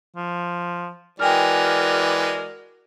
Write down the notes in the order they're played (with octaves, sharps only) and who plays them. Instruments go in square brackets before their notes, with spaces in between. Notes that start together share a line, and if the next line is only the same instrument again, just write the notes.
[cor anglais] F3
[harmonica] E3 G#3 [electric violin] F#4 A#4 [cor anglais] D5 [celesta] G5 G#5 F6